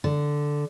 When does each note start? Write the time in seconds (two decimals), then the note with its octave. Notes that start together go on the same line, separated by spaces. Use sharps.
0.04 D3